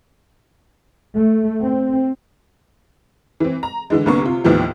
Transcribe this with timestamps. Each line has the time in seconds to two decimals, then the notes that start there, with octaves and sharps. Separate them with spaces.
1.15 A3
1.62 C4
3.40 E3 C4
3.63 A#5
3.90 D3 E3 G#3
4.06 C2 D3 A#3 B3 C#6
4.22 C3 F4
4.44 D#2 A2 E3 F3 B3